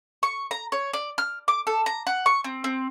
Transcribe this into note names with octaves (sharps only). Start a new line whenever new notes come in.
C#6
A#5
C#5
D5
F6
D6
A4
A#5
F#5
C#6
C4
C4